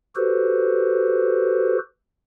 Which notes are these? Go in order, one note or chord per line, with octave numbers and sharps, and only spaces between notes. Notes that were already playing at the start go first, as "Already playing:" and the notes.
F#4 G4 A4 B4 C5